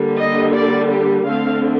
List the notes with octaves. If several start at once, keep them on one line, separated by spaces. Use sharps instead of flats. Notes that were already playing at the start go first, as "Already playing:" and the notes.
Already playing: D3 G3 A#3
D#5
D5
G4
D3 A3 C4 F5